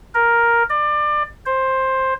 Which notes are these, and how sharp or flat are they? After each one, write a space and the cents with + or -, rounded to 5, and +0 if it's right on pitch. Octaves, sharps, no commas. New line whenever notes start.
A#4 +5
D5 +25
C5 +10